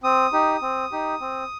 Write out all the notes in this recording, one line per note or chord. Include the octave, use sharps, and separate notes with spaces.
C4 D#6
D#4 G4
C4
D#4 G4
C4